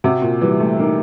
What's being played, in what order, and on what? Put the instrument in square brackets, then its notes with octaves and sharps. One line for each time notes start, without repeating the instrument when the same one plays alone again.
[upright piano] C3 [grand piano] F#4
[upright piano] A#2
[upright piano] E3 [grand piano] G3
[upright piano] A3
[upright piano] A#3 [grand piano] D#4